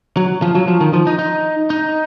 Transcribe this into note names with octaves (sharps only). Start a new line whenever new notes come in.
F#3
F3
F#3
F3
D#3
F3
D#4
D#4
D#4